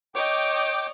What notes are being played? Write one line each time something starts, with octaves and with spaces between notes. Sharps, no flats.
C#5 D#5 G5 D6